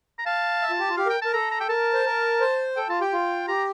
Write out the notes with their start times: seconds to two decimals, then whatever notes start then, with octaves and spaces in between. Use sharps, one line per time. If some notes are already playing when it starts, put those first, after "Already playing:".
0.19 A#5
0.26 F5 A5
0.62 E5
0.70 F4
0.80 G4
0.89 F4
0.97 G4 F5
1.06 A#4 G5
1.22 A#4 A5
1.33 A4 A#5
1.51 A#5
1.60 G5
1.69 A#4 A5
1.94 C5
2.05 A#4
2.41 C5
2.76 A4 G5
2.89 F4 A5
3.01 G4 G5
3.13 F4
3.48 G4 A#5